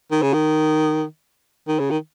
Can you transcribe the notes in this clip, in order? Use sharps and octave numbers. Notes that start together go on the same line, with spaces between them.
D#3
C#3
D#3
D#3
C#3
D#3